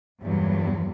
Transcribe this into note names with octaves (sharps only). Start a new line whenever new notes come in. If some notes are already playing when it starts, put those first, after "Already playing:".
E2 G2 A#2 F#3